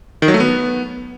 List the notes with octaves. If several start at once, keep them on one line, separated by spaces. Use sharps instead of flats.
D#3
F#3
A3
B3